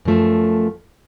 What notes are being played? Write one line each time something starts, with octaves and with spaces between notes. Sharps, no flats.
F#2 F3 A3